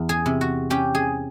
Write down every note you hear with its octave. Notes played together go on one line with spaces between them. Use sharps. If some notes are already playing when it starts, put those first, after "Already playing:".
Already playing: E2
G#4
C3
F#4
C#4 G4
G#4